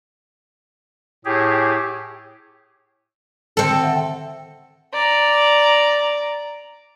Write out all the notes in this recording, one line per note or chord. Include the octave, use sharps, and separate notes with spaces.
A2 G4 G#4
D3 D#3 C4 A4
E5 F#5 G5
D5 A#5